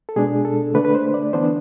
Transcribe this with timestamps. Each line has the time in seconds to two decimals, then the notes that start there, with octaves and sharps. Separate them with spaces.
0.09 A4
0.16 B2 G#3 D4 G#4
0.45 A4
0.74 D3 A3 D4 B4
0.85 B4
0.95 C5
1.14 D5
1.33 E3 B3 D4 C5